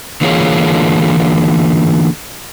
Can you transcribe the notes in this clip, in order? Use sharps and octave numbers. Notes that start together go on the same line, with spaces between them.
D3 E3 A#3 F4 G#4 C#5